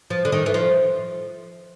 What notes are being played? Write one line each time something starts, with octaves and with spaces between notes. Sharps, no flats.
F3
D3
D#3
E3
F3